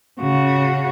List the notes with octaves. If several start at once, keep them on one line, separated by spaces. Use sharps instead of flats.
C#3 F#4